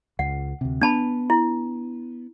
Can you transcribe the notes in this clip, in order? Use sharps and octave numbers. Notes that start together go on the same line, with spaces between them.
C#2 F#5
D2 C3
B3 D4 A5 B5
E4